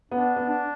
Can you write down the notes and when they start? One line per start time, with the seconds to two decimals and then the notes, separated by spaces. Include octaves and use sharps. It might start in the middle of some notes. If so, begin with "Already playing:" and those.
0.11 B3 D4
0.36 B3
0.49 D4